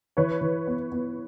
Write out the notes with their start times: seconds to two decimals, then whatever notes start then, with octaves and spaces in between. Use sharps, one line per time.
0.17 E3 B4 C#5
0.41 E3
0.67 B3
0.92 B3